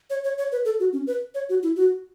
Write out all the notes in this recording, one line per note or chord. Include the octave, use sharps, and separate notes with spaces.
C#5
C#5
C#5
B4
A4
F#4
C#4
B4
C#5
F#4
E4
F#4